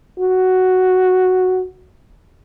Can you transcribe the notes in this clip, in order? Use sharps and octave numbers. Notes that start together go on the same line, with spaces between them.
F#4